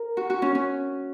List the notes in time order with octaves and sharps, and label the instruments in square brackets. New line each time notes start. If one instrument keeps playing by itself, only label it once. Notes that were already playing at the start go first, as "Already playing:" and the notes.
Already playing: [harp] A#4
F#4
F#4
C#4
C#4